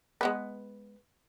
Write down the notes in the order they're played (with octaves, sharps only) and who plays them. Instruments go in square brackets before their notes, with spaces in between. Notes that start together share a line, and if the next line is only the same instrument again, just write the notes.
[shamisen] G#3 B3 B4